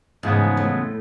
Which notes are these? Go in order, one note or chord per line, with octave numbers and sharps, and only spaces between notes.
E2 G#2 C#3 F3 G#3 B3
A2